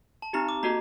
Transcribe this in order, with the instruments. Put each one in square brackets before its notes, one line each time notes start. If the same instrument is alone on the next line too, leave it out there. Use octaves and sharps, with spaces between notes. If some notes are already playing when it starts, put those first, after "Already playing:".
[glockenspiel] A5
[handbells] C4 D#4 G4 [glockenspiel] A#5
[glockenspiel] D6
[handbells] A#3 F#4 A4 D#5 [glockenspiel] A#5